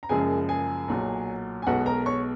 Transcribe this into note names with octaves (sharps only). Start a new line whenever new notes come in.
A#5
F#1 F#2 C#3 F3 G#3 G#4 G#5
G#4 G#5
B1 A#2 F#3
G#5
B1 B2 G#3 B3 F#4 F#5
A#4 A#5
C#5 C#6